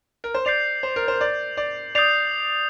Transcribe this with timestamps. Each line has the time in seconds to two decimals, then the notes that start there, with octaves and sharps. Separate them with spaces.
0.24 A#4
0.34 C5
0.45 D5 G6 C7 F7
0.83 C5
0.96 A#4
1.08 C5
1.21 D5
1.57 D5
1.95 D5 D#6 G6 C7 F7